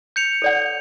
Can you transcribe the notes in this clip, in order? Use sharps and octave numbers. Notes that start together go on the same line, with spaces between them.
G6 C#7 F7
A4 D5 F#5